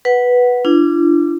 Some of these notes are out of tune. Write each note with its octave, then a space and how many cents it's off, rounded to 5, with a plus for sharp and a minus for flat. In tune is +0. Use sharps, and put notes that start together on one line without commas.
B4 -5 F#5 +0
D4 +0 F4 -45